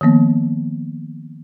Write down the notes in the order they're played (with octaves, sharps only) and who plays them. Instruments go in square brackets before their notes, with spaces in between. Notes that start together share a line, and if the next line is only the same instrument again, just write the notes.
[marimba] D#3 F3 A#3 B3